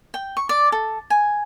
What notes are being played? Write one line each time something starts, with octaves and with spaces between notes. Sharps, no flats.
G5
C#6
D5
A4
G#5